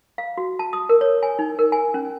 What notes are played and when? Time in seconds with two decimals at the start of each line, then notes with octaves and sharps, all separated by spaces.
0.18 F5
0.37 F#4
0.59 A5
0.73 D#6
0.89 A#4
1.01 C#5
1.23 G#5
1.39 D#4
1.59 A#4
1.72 G#5
1.94 C#4